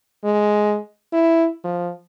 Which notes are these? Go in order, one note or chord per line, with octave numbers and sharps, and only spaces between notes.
G#3
E4
F3